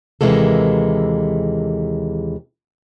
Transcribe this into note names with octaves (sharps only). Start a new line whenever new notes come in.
D#2 C3 E3 G#3 A#3 A4